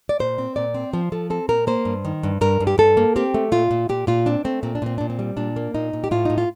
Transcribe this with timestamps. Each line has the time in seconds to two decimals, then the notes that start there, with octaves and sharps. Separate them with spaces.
0.09 D5
0.20 A#2 C5
0.38 C4
0.56 A#2 D5
0.74 C4
0.93 F3 C5
1.12 F3 A4
1.30 C4 A4
1.49 A#2 A#4
1.67 A#3 C5
1.85 G2
2.05 D#3
2.23 G2
2.41 G2 A#4
2.60 G2
2.67 G4
2.78 G2 A4
2.97 A#3
3.16 C4 G4
3.34 A3
3.52 A#2 F4
3.71 A#2
3.89 A#2 G4
4.07 A#2 F4
4.26 C4 D4
4.45 A3 C4
4.63 A#2 C4
4.75 D4
4.82 A#2 C4
4.98 A#2 D4
5.10 C4
5.19 G3
5.37 A#2 D4
5.56 A#3
5.74 A#2 D#4
5.93 A#2
6.04 G4
6.11 A2 F4
6.25 A2 D#4
6.38 F4